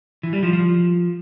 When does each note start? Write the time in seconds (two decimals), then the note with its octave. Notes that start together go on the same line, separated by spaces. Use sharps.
0.23 E3
0.33 G3
0.43 F3
0.53 F3